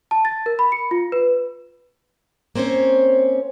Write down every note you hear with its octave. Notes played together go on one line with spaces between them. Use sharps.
A5
A6
A#4
B5
C#7
F4
B4
A#3 C4 C#4 C5 C#5